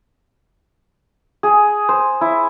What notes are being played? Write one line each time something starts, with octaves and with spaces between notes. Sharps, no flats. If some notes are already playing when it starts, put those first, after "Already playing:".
G#4
C5
E4